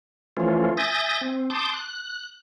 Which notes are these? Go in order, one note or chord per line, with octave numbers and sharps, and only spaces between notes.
E3 F3 A3 C#4 F4
E5 G#5 D#6 G6 A6 A#6
C4
A5 C6 D6 D#6 G6
F#6